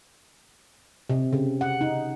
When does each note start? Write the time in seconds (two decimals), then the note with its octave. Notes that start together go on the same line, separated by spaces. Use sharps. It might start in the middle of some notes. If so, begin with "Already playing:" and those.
1.10 C3
1.33 C#3
1.61 F#5
1.81 D#4